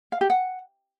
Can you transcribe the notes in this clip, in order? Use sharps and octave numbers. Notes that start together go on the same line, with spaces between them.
F5
G4
F#5